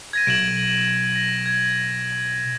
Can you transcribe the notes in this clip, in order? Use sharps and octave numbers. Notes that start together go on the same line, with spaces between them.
G#6 A#6 D#7
B1 D7 E7 F#7
A#6
G#6